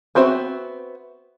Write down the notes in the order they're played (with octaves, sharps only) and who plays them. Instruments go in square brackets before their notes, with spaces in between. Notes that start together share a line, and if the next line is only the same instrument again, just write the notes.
[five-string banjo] B3 C4 F#4 E5 F#5